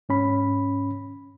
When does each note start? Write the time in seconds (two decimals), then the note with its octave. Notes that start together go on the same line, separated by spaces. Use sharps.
0.09 G#2 C#4 B5